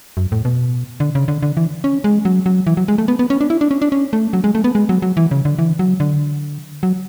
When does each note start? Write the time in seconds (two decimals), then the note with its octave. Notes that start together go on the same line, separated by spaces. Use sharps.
0.17 F#2
0.32 A2
0.45 B2
1.00 D3
1.15 C#3
1.28 D3
1.43 D3
1.57 E3
1.84 C#4
2.04 G#3
2.25 F#3
2.46 F#3
2.67 E3
2.77 F#3
2.88 G#3
2.98 A3
3.08 B3
3.19 B3
3.30 C#4
3.41 D4
3.50 E4
3.61 D4
3.71 C#4
3.82 D4
3.92 C#4
4.13 A3
4.33 F#3
4.44 G#3
4.55 A3
4.64 B3
4.75 G#3
4.89 F#3
5.02 F#3
5.17 E3
5.31 C#3
5.45 D3
5.59 E3
5.79 F#3
6.00 D3
6.83 F#3